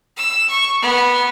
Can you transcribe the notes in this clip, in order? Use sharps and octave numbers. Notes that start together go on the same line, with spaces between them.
E6
C#6
B3